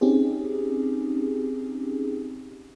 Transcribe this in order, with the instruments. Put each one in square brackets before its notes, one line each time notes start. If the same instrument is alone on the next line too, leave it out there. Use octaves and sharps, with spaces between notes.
[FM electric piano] C4 C#4 D#4 G4 G#4